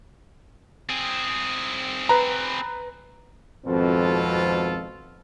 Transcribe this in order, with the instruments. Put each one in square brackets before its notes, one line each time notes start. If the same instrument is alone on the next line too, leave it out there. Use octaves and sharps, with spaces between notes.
[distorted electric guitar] C4 G#4
[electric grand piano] B4 A#5
[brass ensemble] G#1 F2 B2 C4 F4 A4